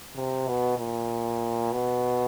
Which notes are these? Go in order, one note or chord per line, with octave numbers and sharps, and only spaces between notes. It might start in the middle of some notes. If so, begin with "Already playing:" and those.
C3
B2
A#2
B2